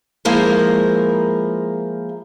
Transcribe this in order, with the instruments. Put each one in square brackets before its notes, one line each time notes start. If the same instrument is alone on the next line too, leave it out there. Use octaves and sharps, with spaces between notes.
[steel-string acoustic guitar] F3 G#3 A#3 E4 A#4 C5